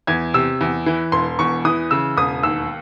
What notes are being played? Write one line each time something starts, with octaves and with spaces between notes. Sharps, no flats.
E2 G#6
C3 E6
E2
E3
E1 C6
E2 C#6
E3 D#6
C#3 E6
E1 D#6
D#2 E6